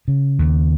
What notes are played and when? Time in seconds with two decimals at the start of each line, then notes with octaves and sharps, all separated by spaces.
0.08 C#3
0.39 D#2